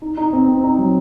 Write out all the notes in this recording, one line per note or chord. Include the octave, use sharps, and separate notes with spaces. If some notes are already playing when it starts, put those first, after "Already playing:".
D#4
D#4
C4
C4
D#4
F#3